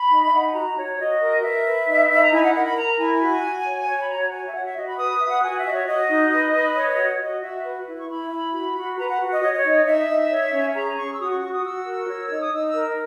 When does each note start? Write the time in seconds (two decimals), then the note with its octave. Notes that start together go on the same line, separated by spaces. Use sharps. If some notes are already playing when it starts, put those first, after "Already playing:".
Already playing: B5
0.10 D#4
0.16 D#5
0.26 E5
0.32 D#4 F#5
0.45 G#5
0.54 F#4 A#5
0.76 F#4 C#5
0.98 F#4 D#5
1.21 A#4
1.43 B4 E5
1.65 B4
1.87 D#4
2.09 D#4 B5
2.22 A#5
2.32 E4 G#5
2.43 F#5
2.54 A#4 F#5
2.64 B5
2.76 A#4 A#5
2.98 E4 G#5
3.20 F#4
3.43 F#4
3.65 C#5
3.87 C#5
4.02 B5
4.10 F#4 A#5
4.23 A#5
4.31 C#5 G#5
4.46 E5
4.53 F#4 F#5
4.64 E5
4.75 F#4 D#5
4.87 B5
4.98 B4 D#6
5.19 B4 E5
5.31 F#5
5.42 F#4 G#5
5.57 E5
5.65 F#4 D#5
5.72 C#5
5.87 F#4 D#5
6.09 D#4
6.31 B4
6.53 B4
6.76 C#5
6.97 F#4
7.20 F#4 D#5
7.42 F#4 E5
7.64 B4
7.87 E4
7.98 C#6
8.09 E4 B5
8.30 E4
8.53 F#4
8.75 F#4
8.97 B4 A#5
9.09 F#5
9.20 F#4
9.31 D#5
9.42 C#5 D#5
9.53 D#5
9.57 C#5
9.64 D#4
9.71 D#5
9.86 D#4 E5
10.08 D#4
10.31 C#5
10.52 C#4
10.74 G#4 A#5
10.97 C#4 C#6
11.12 E6
11.19 F#4 D#6
11.31 C#6
11.42 F#4 C#6
11.53 D#6
11.64 F#4 E6
11.86 A#4
12.09 C#5
12.30 D#4
12.40 D#6
12.52 D#4 E6
12.68 E6
12.74 A#4